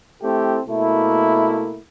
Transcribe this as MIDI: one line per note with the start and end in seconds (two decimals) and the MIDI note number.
0.23 0.59 57
0.23 0.59 60
0.23 0.59 64
0.23 0.59 67
0.23 0.59 69
0.68 1.79 47
0.68 1.79 57
0.68 1.79 58
0.68 1.79 64